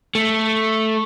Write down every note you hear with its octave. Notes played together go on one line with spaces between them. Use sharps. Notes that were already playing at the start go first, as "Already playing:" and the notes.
A3